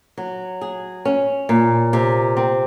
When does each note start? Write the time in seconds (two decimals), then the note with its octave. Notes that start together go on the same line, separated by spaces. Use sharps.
0.17 F#3
0.61 G#4
1.05 C#4
1.49 A#2
1.93 C3
2.37 C4